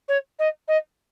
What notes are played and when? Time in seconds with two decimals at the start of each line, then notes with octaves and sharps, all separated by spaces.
0.08 C#5
0.39 D#5
0.68 D#5